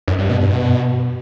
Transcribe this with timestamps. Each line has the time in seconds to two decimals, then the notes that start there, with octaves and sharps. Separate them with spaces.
0.08 F#2
0.18 G2
0.29 B2
0.40 G2
0.51 B2